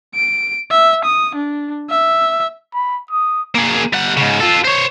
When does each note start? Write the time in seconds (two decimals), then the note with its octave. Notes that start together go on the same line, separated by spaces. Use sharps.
0.15 D7
0.71 E5
1.05 D#6
1.35 D4
1.89 E5
2.74 B5
3.11 D#6
3.55 A#3 G#4
3.93 G3 F#5
4.17 G#2 C#3
4.40 F4 A4
4.64 C5 C#5